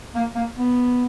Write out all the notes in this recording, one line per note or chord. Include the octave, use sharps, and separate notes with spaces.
A#3
A#3
B3